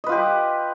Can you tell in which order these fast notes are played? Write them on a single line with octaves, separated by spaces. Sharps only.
D#5 B4 F4 G4